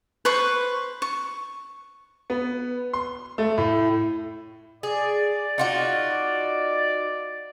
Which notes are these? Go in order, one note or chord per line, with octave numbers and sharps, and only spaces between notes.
B4 C5 C#6
C#6
B3
C6
A3
A2
G#4 D5
D#4 F4 F#4